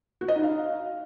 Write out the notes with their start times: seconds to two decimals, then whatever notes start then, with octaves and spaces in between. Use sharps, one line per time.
0.21 F#4
0.28 D#5
0.36 D#4
0.43 F5